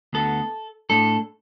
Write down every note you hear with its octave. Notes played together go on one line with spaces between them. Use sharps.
D2 D3 B3 A4
A2 A3 D4 A4